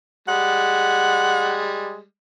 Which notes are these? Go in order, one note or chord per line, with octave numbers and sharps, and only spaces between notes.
G3 G#3 F#5